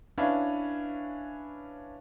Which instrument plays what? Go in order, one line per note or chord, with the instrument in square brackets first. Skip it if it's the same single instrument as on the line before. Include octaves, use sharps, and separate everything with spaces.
[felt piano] C#4 D4 E4 B4 F5